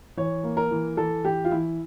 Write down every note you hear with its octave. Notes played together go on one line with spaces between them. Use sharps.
E3 C#5
A#3
A#4
E3
E3 A4
E3 G4
F4
E3 E4